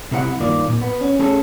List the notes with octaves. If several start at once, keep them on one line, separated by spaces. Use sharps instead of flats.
C2 C3 E4 A4 F#5
G2 D#3 A#3 F4 D5
A#2
B3
C#4
A3 C#4 G#4 A4